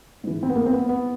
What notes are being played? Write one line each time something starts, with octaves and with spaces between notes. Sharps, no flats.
G#2 E3
C4
B3
A#3
C4
B3
B3